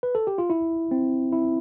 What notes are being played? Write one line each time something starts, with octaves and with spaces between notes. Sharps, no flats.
B4
A4
G4
F4
E4
C4
E4